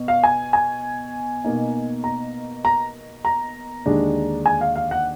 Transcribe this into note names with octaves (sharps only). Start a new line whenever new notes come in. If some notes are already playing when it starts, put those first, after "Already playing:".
Already playing: B2
F5
G#5
G#5
B2 A#3 D#4
A#5
A#5
A#5
D#2 D3 G#3 D4
G#5
F5
F5
F#5